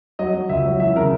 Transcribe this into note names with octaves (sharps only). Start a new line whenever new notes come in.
F#3 D#5
F#3
C#2 E5
F#3
E3 E5
C#3 A#4